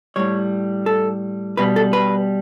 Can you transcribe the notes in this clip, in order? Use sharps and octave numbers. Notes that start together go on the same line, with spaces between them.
A2 G3 C#5
A4
B2 G3 B4
A4
B4